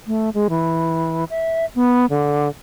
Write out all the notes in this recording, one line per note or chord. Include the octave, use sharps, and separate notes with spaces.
A3
G#3
E3
E5
B3
D3